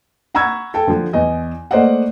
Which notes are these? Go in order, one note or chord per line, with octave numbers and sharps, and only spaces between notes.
F#5 A#5 B5 C#6 E6 G#6
A4 G5 A5
D3 F3
E2 D#5
A3 A#3 C5 D5 D#5 F#5